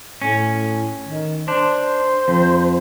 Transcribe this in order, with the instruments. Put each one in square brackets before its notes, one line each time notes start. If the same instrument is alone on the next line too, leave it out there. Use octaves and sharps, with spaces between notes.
[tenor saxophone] A2 [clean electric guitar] C#4
[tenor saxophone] D#3
[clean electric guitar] D4 [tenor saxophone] C5
[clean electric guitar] F2